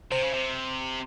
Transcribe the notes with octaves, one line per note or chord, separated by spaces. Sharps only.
C3 C5
C#3
C3